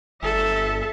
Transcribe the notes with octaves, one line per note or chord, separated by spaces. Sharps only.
G1 A4 E5